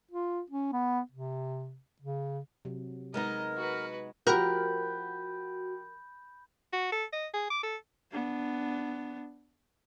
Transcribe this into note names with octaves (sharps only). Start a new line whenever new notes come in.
F4
C#4
B3
C3
C#3
C3 F#3
G#3 B3 D#4 A#4 D#5
F#4 B4
F3 F#4 G4 A#4 B5 F#6 G6
F#4
A4
D#5
G#4
D6
A4
B3 D4